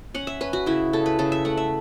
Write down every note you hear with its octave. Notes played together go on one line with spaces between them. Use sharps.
C#4 F#5
E5
C#4 B4
F#4
C#3 E4
C#3 A4
B4
C#3 A4
E5
A3 F#5
E5